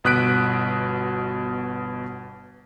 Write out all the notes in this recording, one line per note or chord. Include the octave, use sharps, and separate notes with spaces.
G1 B2 D#6 F#6 B6 D7